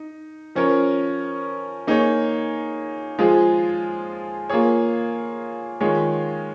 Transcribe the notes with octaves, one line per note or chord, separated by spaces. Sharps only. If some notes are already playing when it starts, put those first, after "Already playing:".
Already playing: D#4
F3 C#4 A#4 C#5
A#3 D#4 G#4 C#5
F3 G#3 F4 G#4
A#3 F4 G#4 C#5
D#3 G#3 F4 G#4 C#5